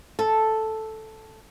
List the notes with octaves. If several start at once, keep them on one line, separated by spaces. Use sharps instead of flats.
A4